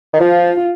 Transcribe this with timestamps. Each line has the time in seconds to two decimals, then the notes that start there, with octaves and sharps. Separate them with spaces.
0.13 D#3
0.20 F3 F4